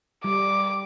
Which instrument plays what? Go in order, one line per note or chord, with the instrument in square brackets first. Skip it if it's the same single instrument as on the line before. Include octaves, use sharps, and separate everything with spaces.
[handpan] G3 [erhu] D6